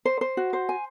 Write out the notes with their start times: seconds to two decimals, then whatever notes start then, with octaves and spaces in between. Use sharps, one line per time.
0.05 C5
0.21 C5
0.37 F#4
0.53 C5
0.69 G#5